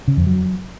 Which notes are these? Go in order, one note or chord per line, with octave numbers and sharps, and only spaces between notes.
C#3
F2
F#3